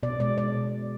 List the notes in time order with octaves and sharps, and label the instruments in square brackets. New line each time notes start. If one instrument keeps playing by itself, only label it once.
[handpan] B2 D5
G#3 D5
B2 D5